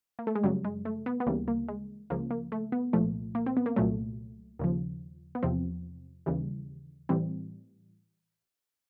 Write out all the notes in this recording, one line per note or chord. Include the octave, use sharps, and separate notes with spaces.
A#3
A3
G#3
F#2 C#3 F#3 G3
G#3
A3
B3
B3
D2 C#3 E3 G3 A#3
A#3
G#3
C#2 C#3 F3 A#3
A#3
A3
B3
C2 A#2 F3 A3
A#3
C4
B3
A#3
C2 A#2 F#3 A3
D#2 C#3 F3
B3
E2 C3 F3 C4
D#2 C#3 E3 G3
A2 E3 G3 C4